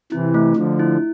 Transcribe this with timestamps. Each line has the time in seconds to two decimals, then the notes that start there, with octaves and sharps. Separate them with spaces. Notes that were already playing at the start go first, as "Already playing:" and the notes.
0.12 C3 E3 E4
0.34 A3
0.56 D3 F3 A3
0.79 E4